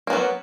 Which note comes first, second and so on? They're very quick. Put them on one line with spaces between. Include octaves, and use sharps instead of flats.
A#3 B3 F#3